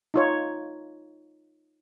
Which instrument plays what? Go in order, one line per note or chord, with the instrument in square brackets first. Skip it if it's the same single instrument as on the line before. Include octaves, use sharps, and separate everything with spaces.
[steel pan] D#4 F4 C#5